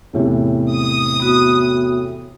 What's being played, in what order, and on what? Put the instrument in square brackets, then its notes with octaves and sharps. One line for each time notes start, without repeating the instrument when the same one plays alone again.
[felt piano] E2 A2 C3
[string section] D#6
[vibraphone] B3 F#4